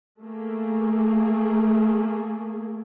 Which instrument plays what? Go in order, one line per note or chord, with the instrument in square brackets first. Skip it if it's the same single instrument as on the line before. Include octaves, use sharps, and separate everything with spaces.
[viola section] A3 A#3 G#4